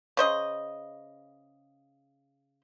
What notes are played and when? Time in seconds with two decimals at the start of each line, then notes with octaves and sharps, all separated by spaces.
0.17 C#3 C5 D#5